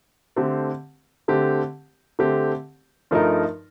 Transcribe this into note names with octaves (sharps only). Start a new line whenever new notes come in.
D3 A3 C4 G4
D3 A3 C4 G4
D3 A3 C4 G4
G2 F3 A3 D#4 A#4